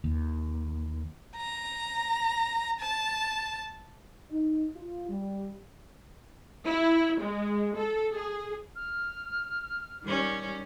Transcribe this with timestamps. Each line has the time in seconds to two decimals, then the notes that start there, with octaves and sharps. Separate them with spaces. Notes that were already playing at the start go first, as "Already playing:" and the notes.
0.04 D#2
1.37 A#5
2.80 A5
4.31 D#4
4.76 F4
5.09 G3
6.64 E4
7.19 G#3
7.75 A4
8.13 G#4
8.76 F6
10.03 D#3 G3 C#4